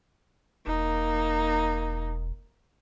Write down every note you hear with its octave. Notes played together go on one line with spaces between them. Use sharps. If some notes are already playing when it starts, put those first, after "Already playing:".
E1 A#3 D#4